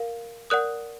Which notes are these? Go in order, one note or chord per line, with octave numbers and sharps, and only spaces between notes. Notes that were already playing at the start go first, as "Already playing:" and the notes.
Already playing: A#4 F5
A#4 D5 F#5 D#6 F#6